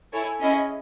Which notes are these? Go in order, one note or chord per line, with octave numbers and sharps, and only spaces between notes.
E4 A4 C#5 G#5
C#4 E4 G#4 D#5